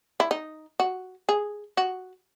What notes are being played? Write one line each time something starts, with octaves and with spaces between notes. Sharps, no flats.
E4
D#4
F#4
G#4
F#4